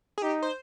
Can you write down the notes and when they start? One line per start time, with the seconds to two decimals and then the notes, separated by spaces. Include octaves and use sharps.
0.18 G#4
0.22 D#4 G4
0.42 C5